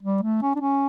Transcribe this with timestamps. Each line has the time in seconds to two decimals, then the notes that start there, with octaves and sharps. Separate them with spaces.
0.03 G3
0.22 A3
0.42 C#4
0.55 D4
0.60 C#4